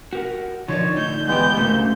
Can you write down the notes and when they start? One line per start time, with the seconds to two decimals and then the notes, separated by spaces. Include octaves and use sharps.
0.13 F#4 G4 A#4 F#5
0.68 D3 F3 D#4 C#5 D5
0.97 A2 D#4 G6
1.28 G#2 E3 G#3 B3 G4 G6
1.57 D2 G#2 C#3 A3 A#3